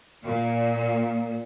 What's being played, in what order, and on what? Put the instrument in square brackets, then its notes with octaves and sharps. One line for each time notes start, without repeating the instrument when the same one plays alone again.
[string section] A#2